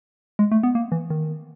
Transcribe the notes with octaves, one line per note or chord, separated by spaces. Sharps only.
G#3
A3
B3
A#3
E3
D#3